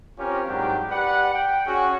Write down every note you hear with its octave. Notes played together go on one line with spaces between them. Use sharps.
C4 C#4 F4 G4 A#4 C#5
G#2 D#3 F#3 G3 D4 G4
G4 B4 D5 F#5
G5
C#4 F#4 G#4